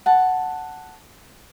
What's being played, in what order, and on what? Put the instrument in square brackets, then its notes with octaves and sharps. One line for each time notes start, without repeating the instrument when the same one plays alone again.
[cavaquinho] F#5 A5